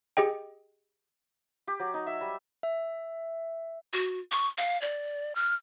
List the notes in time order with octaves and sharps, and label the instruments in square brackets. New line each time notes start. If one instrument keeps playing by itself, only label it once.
[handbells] G4 G#4 D#5 G5
[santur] G4
F#3
D#4
E5
G3
[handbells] E5
[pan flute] F#4
C#6
F5
D5
F6